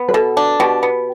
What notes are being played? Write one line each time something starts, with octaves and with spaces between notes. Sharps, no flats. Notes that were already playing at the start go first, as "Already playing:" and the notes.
Already playing: B3
B4
B2 A4
D4
B2 G4
B3